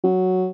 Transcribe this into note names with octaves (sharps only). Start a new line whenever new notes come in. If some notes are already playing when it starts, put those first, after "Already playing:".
F#3